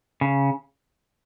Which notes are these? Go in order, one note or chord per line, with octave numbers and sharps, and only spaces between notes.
C#3